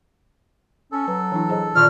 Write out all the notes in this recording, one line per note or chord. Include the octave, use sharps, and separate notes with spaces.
C#4 A4
F#3 B4
E3 D4 E4
G#4 C5 D#5
A#2 D#3 D5 C#6 F6